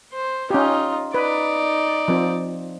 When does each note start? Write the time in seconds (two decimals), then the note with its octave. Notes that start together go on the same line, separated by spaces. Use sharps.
0.13 C5
0.50 C#4 D#4 F4 G4
1.14 D#4 B4 D5
2.08 F3 C4